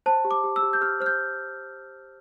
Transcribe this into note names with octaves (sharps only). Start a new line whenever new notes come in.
C5 A5
G4
D6
G4
E6
G4
G6
G4 F6
C5 F6
G6